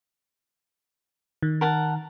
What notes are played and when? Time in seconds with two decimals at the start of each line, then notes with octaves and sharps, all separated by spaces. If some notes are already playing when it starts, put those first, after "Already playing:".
1.43 D#3
1.61 A#4 F#5 A5